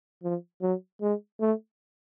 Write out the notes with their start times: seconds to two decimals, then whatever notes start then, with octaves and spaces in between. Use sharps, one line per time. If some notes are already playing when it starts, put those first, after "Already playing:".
0.23 F3
0.62 F#3
1.02 G#3
1.41 A3